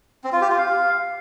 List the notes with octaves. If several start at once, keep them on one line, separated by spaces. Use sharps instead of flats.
C4
F4
G4
F4
F5